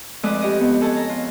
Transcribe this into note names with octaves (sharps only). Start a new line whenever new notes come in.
F2 G#3 A3 B4 D5 D#6
G4 C#5 D#5 D#6
B3
G#4 A4 C#5 A5
A#5
F4